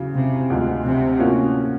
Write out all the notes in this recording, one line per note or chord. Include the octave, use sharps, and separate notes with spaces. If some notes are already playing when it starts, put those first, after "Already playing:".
Already playing: E2 C#3 F#3
C3
D2 D3 F3 G#3
C3
A2 F3 A#3 C#4 F#4